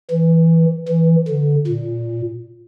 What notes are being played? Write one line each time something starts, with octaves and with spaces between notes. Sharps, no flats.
E3
E3
D3
A#2